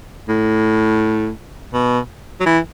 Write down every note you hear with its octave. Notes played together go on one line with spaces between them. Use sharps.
A2
B2
F#3
E3